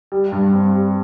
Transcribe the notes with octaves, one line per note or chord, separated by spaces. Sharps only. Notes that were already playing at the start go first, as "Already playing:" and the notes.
G3
G2
C4
G3